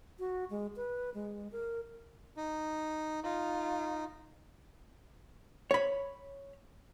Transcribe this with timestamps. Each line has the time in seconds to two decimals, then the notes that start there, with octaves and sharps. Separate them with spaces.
0.19 F#4
0.50 G#3
0.76 B4
1.14 G#3
1.52 A#4
2.37 D#4
3.24 D#4 F4
5.71 C#5 B5